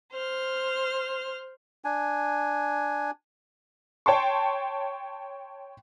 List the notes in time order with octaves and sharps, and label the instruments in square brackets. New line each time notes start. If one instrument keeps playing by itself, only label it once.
[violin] C5 F6
[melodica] D4 G#5
[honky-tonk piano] C#5 G5 A5 C6 C#6